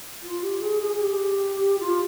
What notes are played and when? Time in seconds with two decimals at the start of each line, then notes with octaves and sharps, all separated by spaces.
0.23 F4
0.43 G4
0.61 G#4
0.82 G#4
0.93 G#4
1.01 G4
1.79 F4